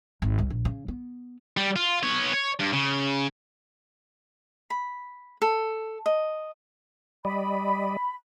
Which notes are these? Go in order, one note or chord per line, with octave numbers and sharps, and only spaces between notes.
G#1
C2
A#1
C#3
B3
G3
F4
B3 C#5
C#5
G2
C#3
B5
A4
D#5
G3 D5 D#5 B5